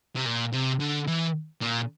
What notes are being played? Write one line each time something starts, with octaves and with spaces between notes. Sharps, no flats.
C3
A#2
C3
D3
E3
A#2